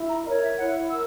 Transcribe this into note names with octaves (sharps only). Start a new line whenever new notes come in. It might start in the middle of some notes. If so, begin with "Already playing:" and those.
Already playing: E4
A#5
A#4 C#5 D#5
E5
E4 F#5
A#4 E6